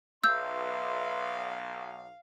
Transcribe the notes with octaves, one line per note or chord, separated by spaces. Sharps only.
B1 B4 E5 F5 C6 E6 G6